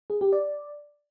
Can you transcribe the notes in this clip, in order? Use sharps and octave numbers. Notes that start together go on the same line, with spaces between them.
G#4
G4
D5